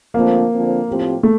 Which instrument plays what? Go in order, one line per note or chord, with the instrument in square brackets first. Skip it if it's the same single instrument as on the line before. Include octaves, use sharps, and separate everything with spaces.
[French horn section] D3 F3 A3 C4 [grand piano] A#3
[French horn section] D3 F3 C4
A2 F3 C4 G4
[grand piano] A3